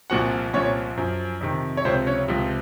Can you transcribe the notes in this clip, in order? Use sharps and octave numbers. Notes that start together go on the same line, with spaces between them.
C2 A#2 F3 F#4 F#5
C2 A#2 F3 C#4 C#5
F#2 F3
F2 C3 D#3
C#5
C#2 C3 F3 C4 C5
C#4 C#5
C#2 C3 F3